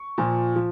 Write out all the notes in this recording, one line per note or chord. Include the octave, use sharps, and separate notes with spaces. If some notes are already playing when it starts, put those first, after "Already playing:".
Already playing: C#6
A#2 F3
F3